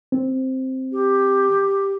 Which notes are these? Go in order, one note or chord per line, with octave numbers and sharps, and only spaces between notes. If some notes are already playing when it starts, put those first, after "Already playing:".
C4
G4